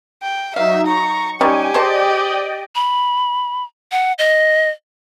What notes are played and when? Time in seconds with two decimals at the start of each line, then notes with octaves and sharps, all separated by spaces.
0.23 G5
0.56 F#3 D#4 E5 F5
0.87 A#5 C#6
1.41 G3 C#4 D#4 G4 G#5
1.74 G#4 C5 D5 D#5 G5 A5
2.75 B5
3.92 F#5
4.19 D#5